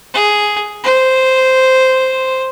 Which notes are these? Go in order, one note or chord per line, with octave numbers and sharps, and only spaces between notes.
G#4
C5